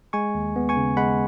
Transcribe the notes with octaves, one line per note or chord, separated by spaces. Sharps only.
G#3 G#5 C#6
D#2
B3
G#5 C#6
C#3
G#3 F#5 B5